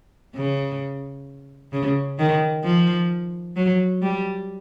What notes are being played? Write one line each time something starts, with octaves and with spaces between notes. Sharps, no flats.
C#3
C#3
D#3
F3
F#3
G3